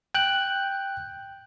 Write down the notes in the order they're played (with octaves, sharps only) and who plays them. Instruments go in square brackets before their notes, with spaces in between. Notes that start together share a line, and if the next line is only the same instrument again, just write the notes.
[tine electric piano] G5 F#6